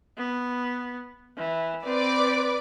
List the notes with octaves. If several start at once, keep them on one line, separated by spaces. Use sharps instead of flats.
B3
E3
C4 B4 D5 D6